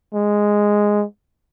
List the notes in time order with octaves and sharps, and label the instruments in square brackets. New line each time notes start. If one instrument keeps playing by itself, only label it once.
[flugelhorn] G#3